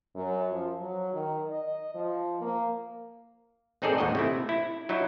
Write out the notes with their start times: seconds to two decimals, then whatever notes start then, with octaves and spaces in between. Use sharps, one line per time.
0.15 F#2
0.52 F3
0.81 F#3
1.13 D#3
1.50 D#5
1.94 F3
2.41 A#3
3.82 A1 C4 D#4 G#4 A4 D5
3.98 A1 D#2 G#2 F#4 D#5
4.15 C3 A3 E4
4.49 E4
4.89 F#3 D#4 E4